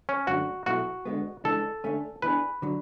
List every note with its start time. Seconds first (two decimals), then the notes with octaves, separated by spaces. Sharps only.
0.09 C#4
0.27 F#2 D3 A3 C#4 F#4
0.66 B2 F#3 B3 E4 F#4 A4
1.06 D3 G#3 B3
1.44 C#2 C#3 E3 G#3 D4 A4
1.84 D3 A3 C#4
2.22 E3 B3 D4 G#4 B4
2.62 D3 F#3